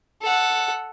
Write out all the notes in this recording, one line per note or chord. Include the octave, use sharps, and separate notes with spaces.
A4 F#5